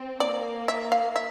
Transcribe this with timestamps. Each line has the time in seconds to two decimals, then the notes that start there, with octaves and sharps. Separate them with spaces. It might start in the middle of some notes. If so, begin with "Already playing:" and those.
Already playing: C4
0.20 A#3 D5
0.68 E5
0.92 F5
1.16 E5